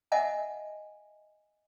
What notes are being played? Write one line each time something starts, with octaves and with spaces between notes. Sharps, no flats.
D#5 E5 F#5 G#5 A5